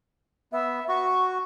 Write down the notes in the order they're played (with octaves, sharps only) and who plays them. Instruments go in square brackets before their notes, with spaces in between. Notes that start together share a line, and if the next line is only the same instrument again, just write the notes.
[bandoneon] B3 [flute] E5
[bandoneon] F#4 [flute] C#6